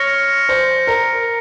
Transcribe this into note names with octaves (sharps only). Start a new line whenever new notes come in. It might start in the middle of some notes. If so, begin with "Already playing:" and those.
Already playing: C#5 F6 A#6 C#7
C5
A#4